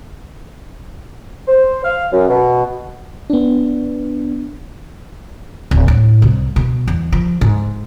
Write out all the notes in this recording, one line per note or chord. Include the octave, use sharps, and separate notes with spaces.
C5
F5
F#2
B2
B3 D4
D1
A2
C2
B2
E2
F3
G#2